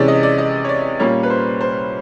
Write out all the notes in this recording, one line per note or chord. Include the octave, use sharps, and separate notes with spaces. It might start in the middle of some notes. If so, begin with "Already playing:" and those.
Already playing: C3 E3 G#3 C#4 D5
D#5
D5
D#5
C#5
D5
A#2 G3 A#3 C#4 C#5
B4
C5
C5